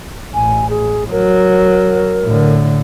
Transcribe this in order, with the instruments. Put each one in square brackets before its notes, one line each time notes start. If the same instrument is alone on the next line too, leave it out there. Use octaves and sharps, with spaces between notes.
[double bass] A1 [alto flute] G#5
[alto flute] G#4
[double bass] F#3 [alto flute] A#4
[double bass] A2 D3